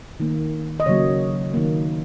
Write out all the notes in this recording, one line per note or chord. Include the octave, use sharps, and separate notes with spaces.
D#3 A#3
D#5
C#3 F#3 A#3 C#5
D#3 A#3